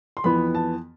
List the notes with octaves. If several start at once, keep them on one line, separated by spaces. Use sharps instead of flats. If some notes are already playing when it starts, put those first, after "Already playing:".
C6
F2 E3 B3 B5
A5